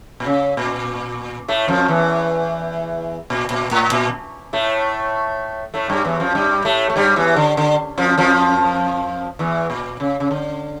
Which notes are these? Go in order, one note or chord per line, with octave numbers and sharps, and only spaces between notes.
A#2
C#3
A#2
A2 A3
F2 F3
E2 E3
A#2
A#2
A2
A#2
A2 A3
A2 A3
G2 G3
E2 E3
F2 F3
G2 G3
A2 A3
A3
G2 G3
E2 E3
D3
D3
F2 F3
F2 F3
E2 E3
A#2
C#3
C#3
D3